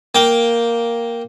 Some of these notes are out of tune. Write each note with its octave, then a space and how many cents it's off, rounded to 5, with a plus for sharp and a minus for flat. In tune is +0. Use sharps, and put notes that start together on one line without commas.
A#3 +0 G5 +0